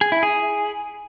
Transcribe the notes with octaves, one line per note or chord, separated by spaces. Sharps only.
G#4
E4
G#4